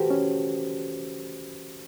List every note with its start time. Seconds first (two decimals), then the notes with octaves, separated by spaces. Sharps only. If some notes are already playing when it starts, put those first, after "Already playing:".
Already playing: E3 F#4 G4 A4 B4 C5
0.10 C#4